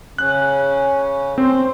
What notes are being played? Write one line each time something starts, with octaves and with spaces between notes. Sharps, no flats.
C#3 C#4 F#6
C4 C5